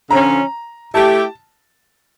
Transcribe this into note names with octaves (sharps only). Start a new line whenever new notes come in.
D3 F3 C#4 F4 A#5
A3 E4 G4 A5